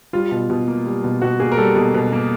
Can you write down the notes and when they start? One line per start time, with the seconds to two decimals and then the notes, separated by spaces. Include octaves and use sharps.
0.13 G3 F4
0.31 B2
0.50 B2
0.68 A#3
0.85 G3
1.04 B2
1.22 B2 F#4
1.40 A#3 G#4
1.52 A#4
1.57 G3 A4
1.76 B2
1.94 B2
2.12 A#3